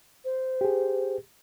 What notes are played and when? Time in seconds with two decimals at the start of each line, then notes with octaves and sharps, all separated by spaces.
0.25 C5
0.61 G4 G#4